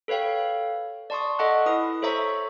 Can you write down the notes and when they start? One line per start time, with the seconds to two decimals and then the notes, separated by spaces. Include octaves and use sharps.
0.08 A4 B4 C#5 F5 G5
1.10 D5 A5 C6 C#6 D#6
1.39 A4 D#5 F#5 A5 C#6 F#6
1.66 E4 B4 D#6
2.02 A4 C5 C#5 E5 A#5 C#6